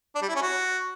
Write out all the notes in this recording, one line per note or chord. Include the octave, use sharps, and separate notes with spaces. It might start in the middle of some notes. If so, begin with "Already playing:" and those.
D4
G3
E4
C#4
F#4